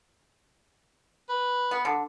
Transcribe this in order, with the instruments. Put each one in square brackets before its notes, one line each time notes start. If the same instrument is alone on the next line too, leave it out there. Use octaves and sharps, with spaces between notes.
[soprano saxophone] B4
[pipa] B3
D3